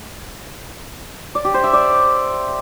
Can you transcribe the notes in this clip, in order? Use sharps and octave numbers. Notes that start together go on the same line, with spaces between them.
D5
G4
C5
E5
D5